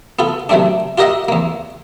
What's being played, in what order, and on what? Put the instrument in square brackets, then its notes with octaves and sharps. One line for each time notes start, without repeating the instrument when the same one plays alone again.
[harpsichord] B3 F4 A4
C3 D#3 F#3 A3 C4 D4
F4 G4 A#4 D#5 E5 F#5
E2 A#3